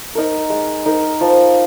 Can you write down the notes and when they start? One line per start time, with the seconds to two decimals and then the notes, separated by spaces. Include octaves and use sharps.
0.15 D#4 A#4
0.50 G#3
0.86 D#4 A#4
1.21 F3